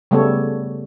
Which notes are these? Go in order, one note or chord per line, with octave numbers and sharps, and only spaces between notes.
C#3 G3 A3 B3 A4 C#5